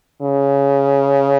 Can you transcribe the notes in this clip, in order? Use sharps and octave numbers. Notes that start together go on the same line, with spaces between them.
C#3